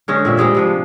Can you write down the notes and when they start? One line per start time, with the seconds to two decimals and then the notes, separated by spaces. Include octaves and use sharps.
0.08 D3 G#3 C#4
0.25 A#2 C4 E5
0.37 G3 G#3 C4 G#4
0.55 C3 F3 D4